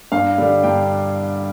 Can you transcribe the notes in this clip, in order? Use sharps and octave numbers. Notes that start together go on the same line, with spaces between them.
G2 F5
D3 G3
G2 G5